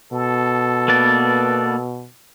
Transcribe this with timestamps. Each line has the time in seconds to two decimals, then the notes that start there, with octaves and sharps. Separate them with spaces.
0.13 B2 A4
0.88 A#3 B3 D5